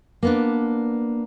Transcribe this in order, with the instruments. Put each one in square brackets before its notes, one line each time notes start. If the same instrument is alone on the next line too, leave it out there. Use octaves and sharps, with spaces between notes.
[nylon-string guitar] A#3 B3 D4